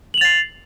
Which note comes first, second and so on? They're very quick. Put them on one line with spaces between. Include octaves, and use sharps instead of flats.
F#7 F7 A6 C7